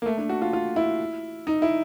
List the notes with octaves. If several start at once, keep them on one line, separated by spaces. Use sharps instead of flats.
A#3
A3
D4
F#4
F4
F4
E4
D#4
E4